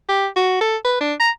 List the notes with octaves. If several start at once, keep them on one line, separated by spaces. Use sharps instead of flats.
G4
F#4
A4
B4
D4
A#5